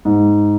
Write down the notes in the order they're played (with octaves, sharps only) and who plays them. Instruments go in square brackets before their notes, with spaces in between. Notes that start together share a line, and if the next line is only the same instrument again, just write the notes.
[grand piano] G#2